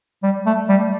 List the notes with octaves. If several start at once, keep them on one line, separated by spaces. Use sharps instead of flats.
G3
A3
G3